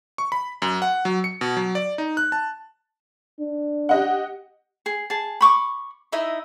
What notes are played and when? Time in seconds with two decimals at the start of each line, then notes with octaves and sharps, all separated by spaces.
0.18 C#6
0.32 B5
0.62 F#2
0.82 F#5
1.05 F#3
1.24 C#7
1.41 B2
1.57 F#3
1.75 D5
1.98 D#4
2.17 F#6
2.32 A5
3.40 D4
3.89 G4 D#5 F#5
4.86 G#4
5.10 G#4 A5
5.41 B5 C#6 D6
6.12 D#4 E4 D#5 E5